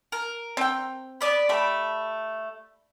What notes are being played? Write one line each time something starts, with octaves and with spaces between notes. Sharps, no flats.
A#4
C4 G5
B3 D5 B5
A3 G4 B5